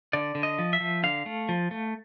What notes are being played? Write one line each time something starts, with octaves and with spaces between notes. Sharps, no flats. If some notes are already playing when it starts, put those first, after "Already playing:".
D3 D5
D3
D#5
F3
E5
F3
D3 F5
A3
F3
A3